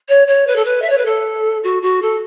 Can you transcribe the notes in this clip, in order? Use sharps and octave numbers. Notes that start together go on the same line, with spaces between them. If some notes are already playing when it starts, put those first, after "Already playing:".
C#5
C#5
B4
A4
B4
E5
C#5
B4
A4
F#4
F#4
A4